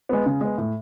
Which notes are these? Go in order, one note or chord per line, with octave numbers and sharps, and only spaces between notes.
G#3 B3
C#3
G#3 B3
A2